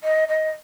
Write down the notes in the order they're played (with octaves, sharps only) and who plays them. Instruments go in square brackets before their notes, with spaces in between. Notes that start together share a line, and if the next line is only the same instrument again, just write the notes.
[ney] D#5
D#5